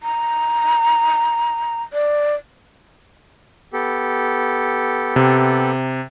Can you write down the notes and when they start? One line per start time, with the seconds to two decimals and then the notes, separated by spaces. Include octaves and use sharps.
0.03 A#5
1.93 D5
3.73 B3 G4 A4
5.16 C3